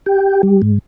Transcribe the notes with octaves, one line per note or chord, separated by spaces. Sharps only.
G4
G3
G#2